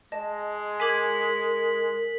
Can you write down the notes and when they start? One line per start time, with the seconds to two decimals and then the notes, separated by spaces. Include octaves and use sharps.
0.12 G#3 D#5 A5
0.80 A#4 G#5 D6 G#6 B6 F#7